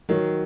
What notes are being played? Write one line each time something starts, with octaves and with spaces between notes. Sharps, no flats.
D#3 F#3